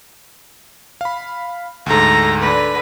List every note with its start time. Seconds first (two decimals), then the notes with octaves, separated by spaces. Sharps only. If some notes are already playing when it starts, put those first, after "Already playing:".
1.01 F5 B5
1.86 D2 G#2 A4 A#5
2.41 D3 B4